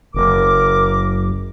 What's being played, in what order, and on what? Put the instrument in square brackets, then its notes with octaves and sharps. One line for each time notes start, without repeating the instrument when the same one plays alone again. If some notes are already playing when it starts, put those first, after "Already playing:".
[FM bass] F#1 [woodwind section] A#4 D6